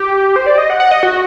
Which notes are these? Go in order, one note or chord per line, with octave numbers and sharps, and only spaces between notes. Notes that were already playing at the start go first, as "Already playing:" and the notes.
Already playing: G4
C5
D5
D#5
F#5
F#5
D#5
F#4